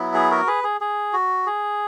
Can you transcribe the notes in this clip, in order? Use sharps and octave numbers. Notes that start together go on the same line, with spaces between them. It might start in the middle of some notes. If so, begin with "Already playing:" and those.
Already playing: F#3 B3 E4
G#4
F#4 A#4
G#4 B4
G#4
G#4
F#4
G#4